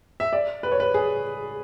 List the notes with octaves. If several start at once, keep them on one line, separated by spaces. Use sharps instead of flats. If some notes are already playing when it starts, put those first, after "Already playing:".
E5
D5
B4
C#5
B4
G#4